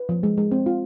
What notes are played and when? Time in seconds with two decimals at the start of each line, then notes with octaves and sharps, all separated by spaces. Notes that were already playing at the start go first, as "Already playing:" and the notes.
Already playing: B4
0.09 F3
0.23 G#3
0.37 G#3
0.52 C4
0.66 F4